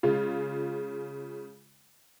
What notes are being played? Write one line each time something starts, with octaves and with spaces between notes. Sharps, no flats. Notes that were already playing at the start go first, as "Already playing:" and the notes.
C#3 G#3 F4